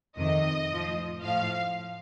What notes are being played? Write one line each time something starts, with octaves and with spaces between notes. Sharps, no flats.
F2 C3 D#3 D#5
A2 F3
A2 F3 F5